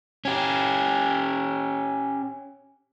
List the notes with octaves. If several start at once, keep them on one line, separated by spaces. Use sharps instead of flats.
C#4 G4